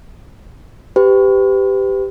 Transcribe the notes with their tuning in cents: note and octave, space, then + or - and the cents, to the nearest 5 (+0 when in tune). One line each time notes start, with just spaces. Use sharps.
G4 +0 B4 +35